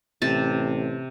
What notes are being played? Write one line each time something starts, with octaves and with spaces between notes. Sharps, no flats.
A1 C3 A5